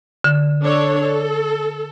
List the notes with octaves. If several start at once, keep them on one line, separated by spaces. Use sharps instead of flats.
D3
D4 A4 C#5
A4